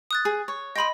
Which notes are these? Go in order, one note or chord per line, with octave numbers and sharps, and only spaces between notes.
D#6 F#6 A6
G#4
C#5
D#5 G5 B5 C6 D#6